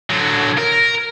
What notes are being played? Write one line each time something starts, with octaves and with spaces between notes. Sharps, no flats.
D3 F#3
A#4